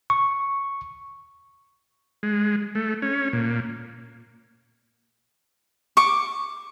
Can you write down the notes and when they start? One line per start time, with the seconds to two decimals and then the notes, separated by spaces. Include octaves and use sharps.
0.10 C#6
2.23 G#3
2.75 A3
3.02 C#4
3.33 A#2
5.97 C#6 D6